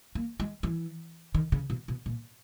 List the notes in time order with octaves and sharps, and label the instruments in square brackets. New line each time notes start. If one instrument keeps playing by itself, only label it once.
[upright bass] A#3
G#3
E3
D#3
C#3
B2
B2
A#2